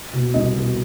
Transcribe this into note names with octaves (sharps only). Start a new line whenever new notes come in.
B2
C2 D#5
B2